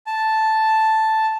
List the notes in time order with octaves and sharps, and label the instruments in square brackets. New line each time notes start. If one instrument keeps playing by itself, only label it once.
[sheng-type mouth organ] A5